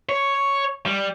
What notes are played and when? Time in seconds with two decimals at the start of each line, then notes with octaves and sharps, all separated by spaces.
0.09 C#5
0.86 G3